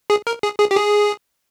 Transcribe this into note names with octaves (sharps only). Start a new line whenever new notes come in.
G#4
A#4
G#4
G#4
G4
G#4